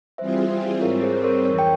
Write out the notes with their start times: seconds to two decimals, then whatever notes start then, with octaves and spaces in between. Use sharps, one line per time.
0.18 E3 G3 C4 F4 G#4 C5 E5
0.81 G#2 G3 C4 A#4 C#5
1.03 G#4 C5
1.24 A#4 C#5
1.45 F2 E3 A#4 C#5
1.59 G5